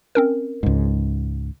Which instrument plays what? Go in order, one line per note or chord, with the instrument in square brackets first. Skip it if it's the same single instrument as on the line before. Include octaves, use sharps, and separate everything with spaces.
[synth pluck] C4 C#4 A#4
[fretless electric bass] C#2 G#2